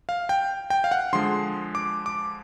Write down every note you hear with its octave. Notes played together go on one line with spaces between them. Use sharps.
F5
G5
G5
F5
F#5
D3 F3 G#3 C6
D6
D6